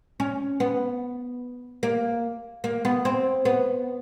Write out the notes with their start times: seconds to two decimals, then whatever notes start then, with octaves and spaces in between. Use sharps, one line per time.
0.20 C#4
0.60 B3
1.83 A#3
2.64 A#3
2.85 B3
3.05 C4
3.45 B3